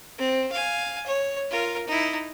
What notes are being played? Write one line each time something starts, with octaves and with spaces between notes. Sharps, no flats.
C4
F5 G#5
C#5
F4 A#4
D#4 E4